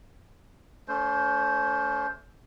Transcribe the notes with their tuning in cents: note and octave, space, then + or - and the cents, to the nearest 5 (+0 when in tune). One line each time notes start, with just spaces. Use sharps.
A3 +0 C#4 +45 C5 +0